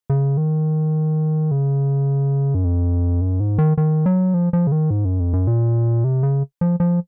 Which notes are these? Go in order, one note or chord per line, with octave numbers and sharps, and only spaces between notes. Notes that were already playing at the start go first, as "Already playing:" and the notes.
C#3
D#3
C#3
F#2
F2
F#2
G#2
D#3
D#3
F#3
F3
F3
C#3
D#3
G#2
F#2
F2
F#2
A#2
C3
C#3
F3
F3